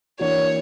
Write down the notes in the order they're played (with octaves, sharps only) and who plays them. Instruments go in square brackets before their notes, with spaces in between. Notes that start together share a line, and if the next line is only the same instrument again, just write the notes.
[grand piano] E3 A#3 D4 F#4 [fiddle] C#5